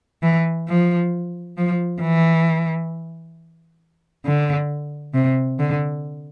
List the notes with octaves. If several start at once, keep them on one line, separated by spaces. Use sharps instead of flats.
E3
F3
F3
E3
D3
C3
D3